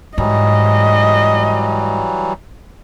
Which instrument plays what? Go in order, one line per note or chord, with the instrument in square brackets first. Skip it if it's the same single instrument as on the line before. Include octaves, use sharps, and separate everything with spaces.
[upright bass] G#2 [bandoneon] E3 F#3 G3 [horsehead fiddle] D#5